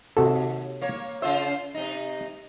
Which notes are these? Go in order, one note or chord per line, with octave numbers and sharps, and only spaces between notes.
D#2 C3 F#4 A4
A#3 C#5
C#3 F4 C5 E5
C3 D#4